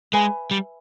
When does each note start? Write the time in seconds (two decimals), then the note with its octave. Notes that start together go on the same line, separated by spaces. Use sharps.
0.13 G#3 B4 E5 G#5 B5
0.51 G3